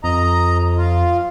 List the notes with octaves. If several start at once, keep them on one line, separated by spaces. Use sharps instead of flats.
F2 D#5 A#5
F4